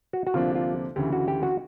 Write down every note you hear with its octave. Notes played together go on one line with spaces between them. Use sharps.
F#4
F#4
D2 C3 F3 A#3 D4 F4
F4
D2 C#3 E3 G4
F#4
G4
F#4